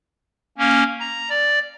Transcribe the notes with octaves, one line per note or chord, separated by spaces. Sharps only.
A#3 C#4
A#5
D5